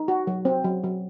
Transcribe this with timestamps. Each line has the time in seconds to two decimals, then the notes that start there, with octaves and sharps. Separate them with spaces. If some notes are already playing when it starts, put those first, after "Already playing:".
Already playing: D#4
0.08 F#4
0.27 F#3
0.45 C4
0.64 F#3
0.84 F#3